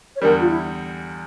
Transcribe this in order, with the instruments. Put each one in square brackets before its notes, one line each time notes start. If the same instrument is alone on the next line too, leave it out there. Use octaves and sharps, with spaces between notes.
[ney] C#5
[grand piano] E2 D3 G3 [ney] A#4
[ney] F4
E4